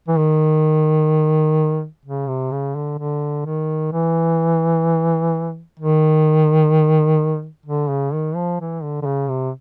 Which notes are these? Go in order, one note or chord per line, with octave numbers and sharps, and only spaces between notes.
E3
D#3
C#3
C3
C#3
D3
D3
D#3
E3
D#3
D3
C#3
D#3
F3
E3
D3
D3
C#3
C3